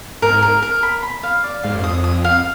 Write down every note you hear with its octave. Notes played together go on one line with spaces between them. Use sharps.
G#2 A#4
A#4
A#4
B5
B5
F5
D5
G#2 F5
F#2
F2 D#6
D#6
F5